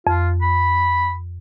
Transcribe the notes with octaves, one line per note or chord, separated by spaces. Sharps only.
F2 F4
B5